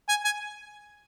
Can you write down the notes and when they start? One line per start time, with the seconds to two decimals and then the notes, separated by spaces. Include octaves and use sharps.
0.09 G#5
0.25 G#5